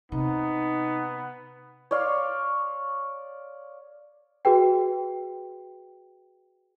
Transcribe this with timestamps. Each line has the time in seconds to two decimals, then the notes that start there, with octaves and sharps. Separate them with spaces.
0.12 C3 B3 D#4
1.91 C#5 D5 F5 C6
4.45 F#4 G#4 B4 G5